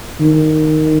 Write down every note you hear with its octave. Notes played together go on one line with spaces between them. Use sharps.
D#3